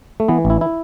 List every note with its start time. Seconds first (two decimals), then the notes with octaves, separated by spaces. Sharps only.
0.20 A3
0.28 E3 B3
0.45 A1
0.50 E4
0.61 E4